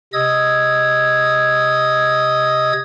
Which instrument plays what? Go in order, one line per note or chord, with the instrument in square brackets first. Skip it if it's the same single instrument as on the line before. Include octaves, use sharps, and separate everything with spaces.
[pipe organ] C3 D#5 D#6 E6 G#6